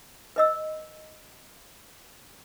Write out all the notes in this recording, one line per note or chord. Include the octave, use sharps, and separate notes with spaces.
B4 D#5 E6